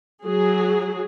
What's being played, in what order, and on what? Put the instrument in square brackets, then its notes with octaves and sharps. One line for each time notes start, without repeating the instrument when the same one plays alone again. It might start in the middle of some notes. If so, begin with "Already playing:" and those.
[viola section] F#3 G#4